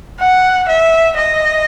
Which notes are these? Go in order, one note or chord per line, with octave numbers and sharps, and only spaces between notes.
F#5
E5
D#5